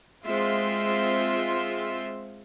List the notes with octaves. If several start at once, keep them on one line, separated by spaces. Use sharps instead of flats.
G#3 C4 F4 E5 C6